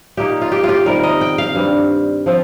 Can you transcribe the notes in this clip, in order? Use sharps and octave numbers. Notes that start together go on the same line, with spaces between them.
A#2 A#3 D#4 G4
F4
G4
F4
G4
C3 D#3 G3 A#4
D#5
G5
F5
G2 G3 C4
F3 C4 F4